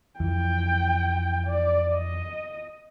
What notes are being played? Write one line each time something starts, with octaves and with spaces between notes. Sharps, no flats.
F2 E3 G5
D5
D#5